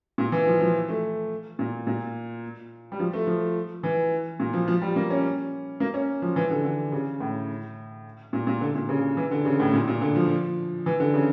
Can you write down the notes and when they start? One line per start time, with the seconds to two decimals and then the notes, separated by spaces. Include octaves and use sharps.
0.18 A#2
0.32 E3
0.46 F3
0.60 F3
0.89 A3
1.59 A#2
1.87 A#2
2.92 G3
2.99 F3
3.13 A3
3.27 F3
3.83 E3
4.40 A#2
4.53 F3
4.68 F3
4.82 G3
4.96 A#3
5.10 C#4
5.80 A#3
5.94 C#4
6.22 F3
6.36 E3
6.50 D3
6.64 D3
6.92 C#3
7.21 A2
8.33 A#2
8.47 A#2
8.61 D3
8.75 A#2
8.89 C#3
9.17 E3
9.31 D3
9.45 C#3
9.60 A2
9.73 A#2
9.88 A#2
10.01 D3
10.16 F3
10.86 E3
11.00 D3
11.14 C#3